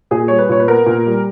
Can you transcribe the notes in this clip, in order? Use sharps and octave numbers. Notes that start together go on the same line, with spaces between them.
A#2 G#4
G3 C#5
B4
A#2 C#5
B4
B3 A#4
A#2
G3